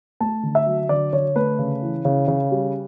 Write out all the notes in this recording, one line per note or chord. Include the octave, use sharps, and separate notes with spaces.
A3 A5
D3
E5
F#3
D3 D5
D3 C#5
A3 B4
C#3
E3
C#3
C#3
G3